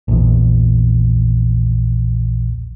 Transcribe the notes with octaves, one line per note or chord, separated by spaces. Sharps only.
A#1 E2